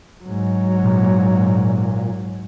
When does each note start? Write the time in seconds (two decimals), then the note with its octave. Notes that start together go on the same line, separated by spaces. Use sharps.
0.24 G#2 F#3
0.84 A#2